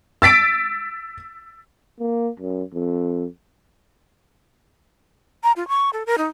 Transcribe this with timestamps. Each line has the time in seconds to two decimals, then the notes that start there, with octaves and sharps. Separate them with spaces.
0.22 E6 A6 B6 D7
2.00 A#3
2.40 F#2
2.74 F2
5.44 A#5
5.56 F4
5.68 C#6
5.93 A4
6.06 A#4
6.18 D#4